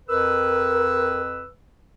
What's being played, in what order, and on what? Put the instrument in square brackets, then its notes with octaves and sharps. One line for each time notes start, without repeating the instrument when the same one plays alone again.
[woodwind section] F2 B4 E6 [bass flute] A#4